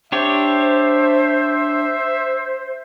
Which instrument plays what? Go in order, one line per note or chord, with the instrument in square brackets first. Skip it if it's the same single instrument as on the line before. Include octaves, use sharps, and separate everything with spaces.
[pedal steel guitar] D4 G4 C#5 [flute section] C5 [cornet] E5